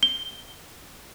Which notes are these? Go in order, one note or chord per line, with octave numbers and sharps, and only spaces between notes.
G7